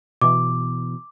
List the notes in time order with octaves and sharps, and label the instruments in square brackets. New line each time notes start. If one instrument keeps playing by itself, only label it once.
[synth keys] B2 E3 [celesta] D6